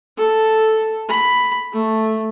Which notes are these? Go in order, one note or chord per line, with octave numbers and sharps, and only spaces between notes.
A4
B5
A3